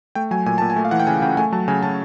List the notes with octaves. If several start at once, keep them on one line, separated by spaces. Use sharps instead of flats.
A3 G5
F#3 G#5
A#2 G#5
A#2 A5
G#5
A3
F5
E3 F#5
G5
C#3 G#5
C#3 G5
A3 G#5
F#3 A5
C#3 G#5
C#3 A5